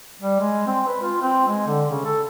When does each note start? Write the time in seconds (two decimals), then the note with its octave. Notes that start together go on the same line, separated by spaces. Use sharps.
0.22 G3
0.40 G#3
0.67 C4
0.87 B4
1.02 F4
1.22 C4
1.48 G#3
1.67 D3
1.90 C#3
2.05 A4